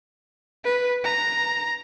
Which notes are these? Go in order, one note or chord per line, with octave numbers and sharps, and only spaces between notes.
B4
A#5